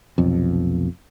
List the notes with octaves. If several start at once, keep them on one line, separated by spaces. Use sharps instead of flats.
F1 B1 F2